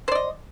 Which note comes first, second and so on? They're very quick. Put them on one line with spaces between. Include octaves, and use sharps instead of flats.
C5 D5 D#5